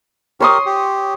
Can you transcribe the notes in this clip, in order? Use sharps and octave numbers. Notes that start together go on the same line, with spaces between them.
G4 A#4 C#5 C6 D#6
G4